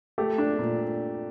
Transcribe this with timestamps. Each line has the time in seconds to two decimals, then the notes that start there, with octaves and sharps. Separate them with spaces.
0.18 A3 G4
0.38 D4
0.59 A#2